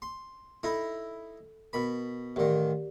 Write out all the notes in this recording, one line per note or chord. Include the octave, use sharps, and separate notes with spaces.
C6
D#4 E4 A4 B5
B2 A#4 B5
A1 D#3 G4 A#4 D5